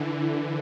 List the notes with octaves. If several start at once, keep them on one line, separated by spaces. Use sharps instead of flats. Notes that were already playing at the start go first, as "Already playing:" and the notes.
Already playing: D3 E3